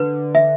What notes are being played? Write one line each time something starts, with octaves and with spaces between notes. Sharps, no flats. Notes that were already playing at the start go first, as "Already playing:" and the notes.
Already playing: D3 B4
E5